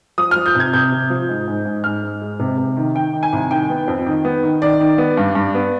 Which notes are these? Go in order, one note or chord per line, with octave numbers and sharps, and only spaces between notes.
F3 D#6
F3 F6
G6
C3 G#6
C3 G6
C3
F3
G#2
G#2
G#2
G#2 F6
G#2
G#3
C3
C3
D#3
D#3 G5
D#3
G#5
C2
D#3 G5
B3
F2
D#3
B3
D#3
D#3 D5
D#3
B3
G2
G2
B3